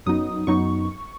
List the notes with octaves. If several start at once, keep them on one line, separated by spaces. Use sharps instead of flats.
F#2 F#3 B3 D#4 D#6
F#2 F#3 B3 D#4 C#6